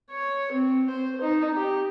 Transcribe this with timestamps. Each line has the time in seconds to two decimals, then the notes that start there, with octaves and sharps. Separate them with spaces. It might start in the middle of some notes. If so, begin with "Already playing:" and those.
0.11 C#5
0.52 C4
0.90 C5
1.21 D#4
1.56 G4